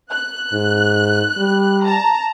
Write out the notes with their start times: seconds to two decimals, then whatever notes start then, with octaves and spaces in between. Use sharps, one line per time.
0.11 F#6
0.53 G#2
1.38 G3
1.84 A5 A#5